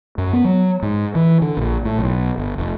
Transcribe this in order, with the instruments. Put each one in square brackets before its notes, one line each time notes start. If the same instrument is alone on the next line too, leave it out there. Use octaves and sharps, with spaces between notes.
[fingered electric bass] F#2
B3
F#3
G#2
E3
D3
A#1
A2
B1
G1
F1